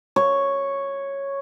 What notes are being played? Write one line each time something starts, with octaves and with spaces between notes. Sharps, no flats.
C#5